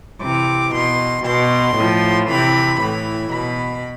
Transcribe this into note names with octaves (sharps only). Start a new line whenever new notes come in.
C3 E3 D6
B2 C6
B2 C6
A2 F3
C3 E3 B5
A2 E3 B5
B2 B5